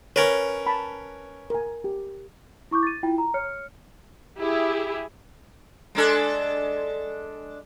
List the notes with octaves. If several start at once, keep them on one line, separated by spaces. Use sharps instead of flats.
C#4 A#4 B4 C#5
A5 B5
A#4 G#5
G4
E4 C#6 D6 G6
A6 D#7
E4 F4 G5
A#5
C#5 F6 C#7
E4 G4 G#4
G#3 D4 A4